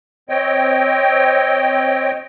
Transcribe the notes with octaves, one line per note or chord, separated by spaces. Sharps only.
C4 C#5 D#5 G5